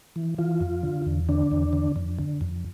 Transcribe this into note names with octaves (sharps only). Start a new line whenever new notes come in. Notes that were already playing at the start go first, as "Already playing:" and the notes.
E3
E3 F4
F2
D3
E2
D3 D4
E2
D3
F2
D3
F2